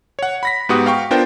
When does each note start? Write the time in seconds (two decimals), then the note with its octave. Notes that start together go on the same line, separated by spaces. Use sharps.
0.19 C#5 F#5
0.43 B5 A#6 B6
0.69 G#2 B3 F#4 G4 F#5 D#6
0.86 F5 G5 C#6
1.11 B3 D4 F4 A#4 C5 G5